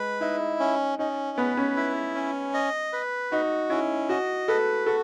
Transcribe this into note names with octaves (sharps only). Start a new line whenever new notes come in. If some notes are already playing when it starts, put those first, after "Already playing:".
Already playing: G#3 B4
D#4 E4
C#4
C#4 D#4
B3 B4
C#4
E4
C#4
D#5
B4
D#4 F#4
C#4 E4
F#4 D#5
A4 B4
F#4 A4